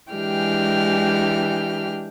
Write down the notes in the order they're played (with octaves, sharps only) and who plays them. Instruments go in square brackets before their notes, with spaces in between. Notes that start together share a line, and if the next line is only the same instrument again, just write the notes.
[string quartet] E3 G#3 D4 G4 G5 F6